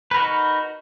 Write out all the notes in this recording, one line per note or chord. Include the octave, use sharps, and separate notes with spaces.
D#4 F#4 A#4 B4